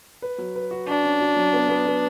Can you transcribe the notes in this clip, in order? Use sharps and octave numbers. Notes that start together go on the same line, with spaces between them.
B4
F#3
B4
F#4
D4 F#4
C#4
F#4
F#3
B3
B3
B3